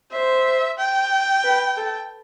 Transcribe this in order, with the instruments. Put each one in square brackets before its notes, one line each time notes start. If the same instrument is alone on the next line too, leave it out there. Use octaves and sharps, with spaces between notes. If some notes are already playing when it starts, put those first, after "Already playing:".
[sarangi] C5 [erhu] E5
[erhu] G5
[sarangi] B4
A4